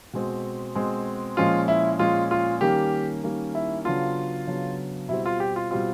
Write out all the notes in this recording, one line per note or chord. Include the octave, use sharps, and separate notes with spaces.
B2 G#3 C4
B2 G#3 C4
A#2 F3 G#3 C#4 F4
E4
A#2 F3 G#3 C#4 F4
F4
D#3 G3 A#3 C#4 G4
D#3 G3 A#3 C#4
E4
C#3 F#3 B3 D4 F4
C#3 F#3 B3 D4
B2 G3 C4 E4
F4
G4
F4
B2 G3 C4 F4